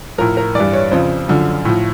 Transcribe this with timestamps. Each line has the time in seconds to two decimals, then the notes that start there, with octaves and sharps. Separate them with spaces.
0.18 A2 F3 A#4
0.37 A#4
0.55 G2 E3 D5
0.73 C#5
0.91 F2 C#3 F3 C5
1.28 F#2 D3 F3
1.65 A2 F3